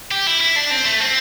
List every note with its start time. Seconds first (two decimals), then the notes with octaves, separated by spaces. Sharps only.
0.11 G4
0.27 E4
0.41 E4
0.56 D4
0.71 C4
0.86 A3
1.00 C4